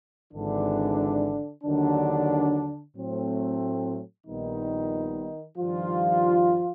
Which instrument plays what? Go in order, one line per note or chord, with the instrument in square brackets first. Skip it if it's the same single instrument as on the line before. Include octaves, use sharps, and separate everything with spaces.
[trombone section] G#1 G#2 D3 E3 D4
D#2 D3 D#3 F#3 D4
A2 F#3 A3 C4
A#1 A#2 D#3 G3 B3 D#4
G2 D#3 F3 G3 F4